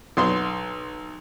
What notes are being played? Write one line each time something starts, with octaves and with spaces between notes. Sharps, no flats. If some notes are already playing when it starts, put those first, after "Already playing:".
B1 C6